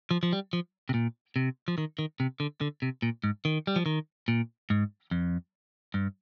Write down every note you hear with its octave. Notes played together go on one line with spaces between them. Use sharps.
F3
F3
G3
F3
C3
A#2
C3
F3
D#3
D#3
C3
D3
D3
C3
A#2
G#2
D#3
G3
F3
D#3
A#2
G#2
F2
G2